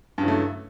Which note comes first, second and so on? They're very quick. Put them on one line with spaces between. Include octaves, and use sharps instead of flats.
G2 C#3 F#3 E3 A3